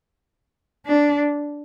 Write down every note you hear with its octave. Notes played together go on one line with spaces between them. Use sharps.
D4